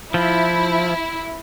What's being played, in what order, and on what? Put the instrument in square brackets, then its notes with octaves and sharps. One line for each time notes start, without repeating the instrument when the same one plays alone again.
[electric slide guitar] F3 [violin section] E4